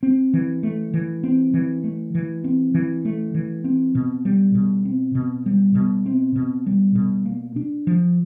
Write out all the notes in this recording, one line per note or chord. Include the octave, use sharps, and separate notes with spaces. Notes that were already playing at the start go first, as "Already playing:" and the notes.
C4
E3
A3
E3
C4
E3
A3
E3
C4
E3
A3
E3
C4
B2
G3
B2
C4
B2
G3
B2
C4
B2
G3
B2
A#3
D4
F3